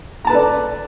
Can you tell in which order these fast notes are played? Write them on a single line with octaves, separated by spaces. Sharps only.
A#5 A5 B4 A4 D5